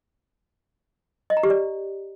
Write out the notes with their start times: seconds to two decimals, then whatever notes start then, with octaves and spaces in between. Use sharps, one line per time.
1.30 D#5
1.37 A#5
1.43 G4
1.50 D5